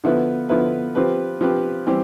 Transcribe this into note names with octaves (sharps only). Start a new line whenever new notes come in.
D3 F3 B3 E4 B4
D3 F3 B3 E4 B4
F3 C4 G4 B4
F3 C4 G4 B4
E3 G3 C4 G4